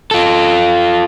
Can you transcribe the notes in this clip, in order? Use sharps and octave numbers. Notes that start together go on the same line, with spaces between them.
F4 A4